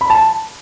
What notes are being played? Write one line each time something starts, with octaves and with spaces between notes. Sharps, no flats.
B5
A5